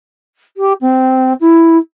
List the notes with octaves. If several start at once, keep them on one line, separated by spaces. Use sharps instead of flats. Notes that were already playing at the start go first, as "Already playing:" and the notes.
G4
C4
E4